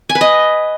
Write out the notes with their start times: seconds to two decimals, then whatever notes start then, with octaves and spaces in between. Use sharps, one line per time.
0.09 G#5
0.15 B4
0.21 D#5